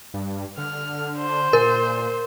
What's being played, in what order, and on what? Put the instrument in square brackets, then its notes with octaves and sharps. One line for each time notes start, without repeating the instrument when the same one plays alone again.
[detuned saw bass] G2
[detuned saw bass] D3 [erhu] F6
[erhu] C5
[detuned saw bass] A#2 [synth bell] A#4